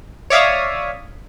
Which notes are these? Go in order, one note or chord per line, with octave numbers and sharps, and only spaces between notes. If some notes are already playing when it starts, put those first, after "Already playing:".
C#5 D5 E5 F5 D#6